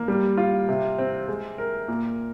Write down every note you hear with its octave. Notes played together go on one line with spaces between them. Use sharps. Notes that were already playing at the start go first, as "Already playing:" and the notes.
Already playing: A#3
G3
F4
C3
C4
G#3
A#4
A#2